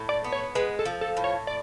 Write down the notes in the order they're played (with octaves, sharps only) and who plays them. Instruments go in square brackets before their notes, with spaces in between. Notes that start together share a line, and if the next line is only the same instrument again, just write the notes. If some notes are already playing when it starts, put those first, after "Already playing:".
Already playing: [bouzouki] A2
[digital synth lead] D5
[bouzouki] B3
[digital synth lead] C#5
[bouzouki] G#3 [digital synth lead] B4
[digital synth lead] A4
[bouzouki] F3
[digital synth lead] A4
[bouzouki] A2
[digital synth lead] C#5
D5